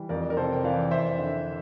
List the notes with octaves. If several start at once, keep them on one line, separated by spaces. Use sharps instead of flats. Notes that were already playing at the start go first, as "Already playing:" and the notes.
Already playing: E3 G3
F2 A#4 D5
A#4
C3 A4 C5
G5
E3 D5 F5
F2 C5 E5
D3